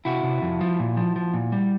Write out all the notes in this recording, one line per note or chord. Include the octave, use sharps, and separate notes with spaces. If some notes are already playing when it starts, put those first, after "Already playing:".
C3 E4 F#4
C3
F2
F3
A#2
F3
F3
A#2
G3